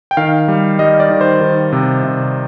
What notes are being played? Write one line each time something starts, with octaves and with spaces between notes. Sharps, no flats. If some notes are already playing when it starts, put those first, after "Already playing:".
G5
D#3 F5
G3
G3 D#5
D5
D#3
C5
D#3
C3
C3